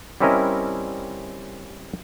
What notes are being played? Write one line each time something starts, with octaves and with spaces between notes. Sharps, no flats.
G3 C4 C#4 E4 A#4 D#5